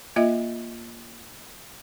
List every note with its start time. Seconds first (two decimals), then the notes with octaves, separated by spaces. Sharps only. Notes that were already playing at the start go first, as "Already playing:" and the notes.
0.16 A#3 F4 D#5 E5